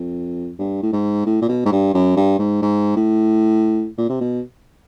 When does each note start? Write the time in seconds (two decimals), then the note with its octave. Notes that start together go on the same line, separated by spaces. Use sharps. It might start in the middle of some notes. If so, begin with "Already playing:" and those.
Already playing: F2
0.59 G2
0.83 A2
0.92 G#2
1.26 A2
1.41 A#2
1.48 B2
1.65 G#2
1.72 G2
1.94 F#2
2.16 G2
2.39 G#2
2.62 G#2
2.96 A2
3.98 A#2
4.09 C3
4.20 B2